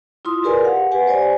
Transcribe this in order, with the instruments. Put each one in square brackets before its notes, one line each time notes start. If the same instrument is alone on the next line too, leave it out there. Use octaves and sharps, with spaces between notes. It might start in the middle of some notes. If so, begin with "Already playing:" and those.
[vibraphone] E4 F4 C6 D#6
G4 G#4 A#4 B4 D5 G#5
F5 F#5
G4 B4 F#5 G#5
G4 C5 D5 G#5